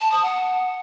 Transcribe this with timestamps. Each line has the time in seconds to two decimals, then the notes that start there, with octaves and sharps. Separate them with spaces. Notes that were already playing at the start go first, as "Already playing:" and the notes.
0.01 A5
0.12 D#6
0.23 F#5